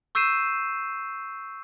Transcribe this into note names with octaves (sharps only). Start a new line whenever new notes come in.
C#6 E6 G6 C7 D#7 E7